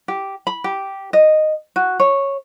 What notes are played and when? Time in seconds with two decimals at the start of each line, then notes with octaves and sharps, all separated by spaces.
0.08 G4
0.47 B5
0.64 G4
1.13 D#5
1.76 F#4
2.00 C#5